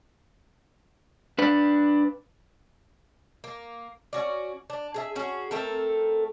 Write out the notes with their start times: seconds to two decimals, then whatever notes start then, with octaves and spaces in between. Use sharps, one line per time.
1.39 D4 B4
3.44 A#3
4.13 C#4 F#4 D5
4.70 D4
4.94 G#4 A4 E5
5.15 C#4 F#4 G#4
5.51 A3 C4 A4 A#4